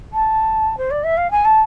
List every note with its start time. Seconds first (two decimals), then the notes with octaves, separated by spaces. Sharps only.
0.13 A5
0.77 C5
0.90 D5
1.03 E5
1.17 F5
1.31 G#5
1.44 A5